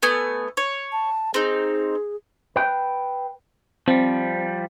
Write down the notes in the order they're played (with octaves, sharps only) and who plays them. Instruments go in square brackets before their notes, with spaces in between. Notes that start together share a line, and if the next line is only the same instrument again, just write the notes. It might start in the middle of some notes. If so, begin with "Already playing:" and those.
[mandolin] A3 B3 G#5
C#5
[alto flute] A5
[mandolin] C4 D#4 [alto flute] G#4
[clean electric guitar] B4 G5
[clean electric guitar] F3 G3 [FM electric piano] C4